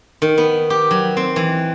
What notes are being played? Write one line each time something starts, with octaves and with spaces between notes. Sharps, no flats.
D#3
B3
G4
F#3
C4
E3